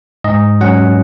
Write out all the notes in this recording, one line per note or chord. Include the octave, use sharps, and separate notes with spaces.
G#2 D#5
F#3 C#4 F#5